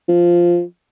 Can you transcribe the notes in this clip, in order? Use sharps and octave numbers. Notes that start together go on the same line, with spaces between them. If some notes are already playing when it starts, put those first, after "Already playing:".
F3